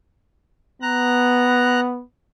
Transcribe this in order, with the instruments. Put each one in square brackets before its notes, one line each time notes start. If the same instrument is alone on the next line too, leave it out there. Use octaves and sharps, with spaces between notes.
[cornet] B3 [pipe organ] A#5 F#6